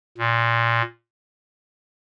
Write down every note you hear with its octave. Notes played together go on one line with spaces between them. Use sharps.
A#2